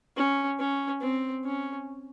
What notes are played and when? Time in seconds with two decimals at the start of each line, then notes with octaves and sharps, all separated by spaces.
0.16 C#4
0.59 C#4
1.01 C4
1.44 C#4